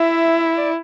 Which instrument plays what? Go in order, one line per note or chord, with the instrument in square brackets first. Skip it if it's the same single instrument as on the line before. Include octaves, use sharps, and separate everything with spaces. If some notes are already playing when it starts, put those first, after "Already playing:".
Already playing: [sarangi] E4 [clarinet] E5
[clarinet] D5